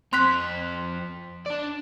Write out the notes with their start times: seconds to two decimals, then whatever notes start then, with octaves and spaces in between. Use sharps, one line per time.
0.13 F2 C4 C6 F#6 B6
1.46 D4 D5